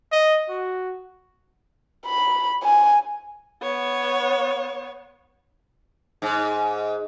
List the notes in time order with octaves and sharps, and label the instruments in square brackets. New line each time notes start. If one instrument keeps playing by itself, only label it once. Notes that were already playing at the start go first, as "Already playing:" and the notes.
[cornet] D#5
F#4
[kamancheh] B5
G#5
B3 C#5
[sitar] G#2